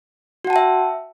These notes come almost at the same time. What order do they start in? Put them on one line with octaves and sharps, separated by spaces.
F#4 F#5 A5 G5 E5